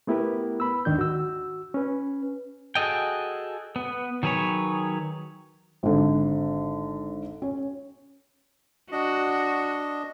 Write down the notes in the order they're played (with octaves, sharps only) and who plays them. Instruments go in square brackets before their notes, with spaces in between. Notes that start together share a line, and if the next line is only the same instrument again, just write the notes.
[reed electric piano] A3 B3 E4 G4 A#4 B4
B5 E6
D#2 G#2 D#3 D4 G6
F#4 E6
C#4 B4
[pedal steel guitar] F#4 G#4 A4 D#5 G5
B3
D#3 F#3 G#4 B4 C#5
[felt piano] G#1 D3
C#4
[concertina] D4 D#5 [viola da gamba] F#4